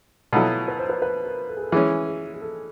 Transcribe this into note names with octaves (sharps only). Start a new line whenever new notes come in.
B2 F#3 B3 E4 F4 A4
B4
C5
B4
B4
A#4
A4
G#4
A4
E3 G#3 C#4 G#4
G#4
G#4
A4